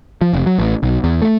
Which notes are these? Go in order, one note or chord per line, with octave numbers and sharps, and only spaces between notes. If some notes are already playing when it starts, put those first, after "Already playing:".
F3
F1
F#3
A1
B1
E2
A3